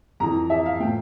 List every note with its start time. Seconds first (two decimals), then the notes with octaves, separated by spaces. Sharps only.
0.20 F2 E3 A#5
0.50 E5
0.66 F5
0.80 A2 F3 G5